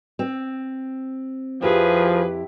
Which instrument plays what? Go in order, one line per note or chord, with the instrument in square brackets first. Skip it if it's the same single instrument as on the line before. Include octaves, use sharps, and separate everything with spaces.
[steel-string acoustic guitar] C4
[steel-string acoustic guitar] F2 E4 G4 [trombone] F3 [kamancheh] G#4 B4